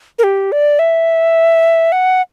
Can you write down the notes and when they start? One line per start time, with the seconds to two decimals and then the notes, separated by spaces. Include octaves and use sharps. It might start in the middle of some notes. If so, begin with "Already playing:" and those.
0.19 A#4
0.24 G4
0.52 D5
0.79 E5
1.92 F#5